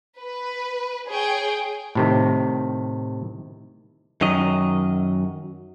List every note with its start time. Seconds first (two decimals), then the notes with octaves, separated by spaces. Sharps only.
0.18 B4
1.07 G#4 C#5 G5
1.95 A2 C3 D#3
4.21 F#2 D#3 F#3 D#5